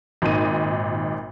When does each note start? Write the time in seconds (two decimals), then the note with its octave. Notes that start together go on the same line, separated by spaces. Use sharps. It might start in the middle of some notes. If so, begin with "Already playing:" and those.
0.22 G#1 A#2 D#4 D#7